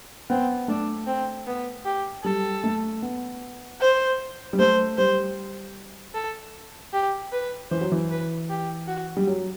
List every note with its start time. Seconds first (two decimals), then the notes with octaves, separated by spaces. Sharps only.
0.30 B3 C4
0.68 A3 D4
1.07 C4
1.47 B3
1.85 G4
2.24 G3 A4
2.64 A3
3.02 B3
3.81 C5
4.53 G3
4.59 A3 C5
4.98 G3 C5
6.14 A4
6.93 G4
7.33 B4
7.70 E3 C5
7.81 F#3
7.92 E3
8.11 B4
8.49 G4
8.88 F#4
9.17 G3
9.27 F#3